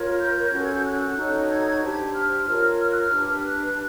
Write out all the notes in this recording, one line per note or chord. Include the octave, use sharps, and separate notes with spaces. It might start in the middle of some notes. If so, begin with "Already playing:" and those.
Already playing: F4 A#4 C#5
G6
C#4 F#4 A4
G#6
G6
F#6
D#4 F#4 A4 C#5
G#6
D4 G4 C5
F6
F4 A#4 C#5
F6
F#6
F6
D4 G4 B4
F#6